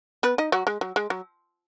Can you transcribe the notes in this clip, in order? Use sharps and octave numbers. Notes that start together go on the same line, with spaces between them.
B3 B4
D#4 D#5
F#3 F#4
G#3
F#3
G#3
F#3